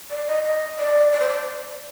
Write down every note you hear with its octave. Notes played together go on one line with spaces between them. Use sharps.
D5
D#5
D#5
D5
D5
C5
D5